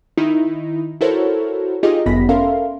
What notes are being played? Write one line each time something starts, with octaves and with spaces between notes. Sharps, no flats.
D#3 D#4 E4
E4 F#4 A4 A#4 C5 C#5
D#4 F4 G4 G#4 D#5
G1 F#2 B3 B5 A#6 B6
C#4 A4 A#4 E5 F5 C6